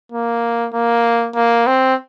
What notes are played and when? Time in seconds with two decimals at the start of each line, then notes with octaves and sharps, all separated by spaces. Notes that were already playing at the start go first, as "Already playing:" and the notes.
0.12 A#3
0.74 A#3
1.36 A#3
1.67 C4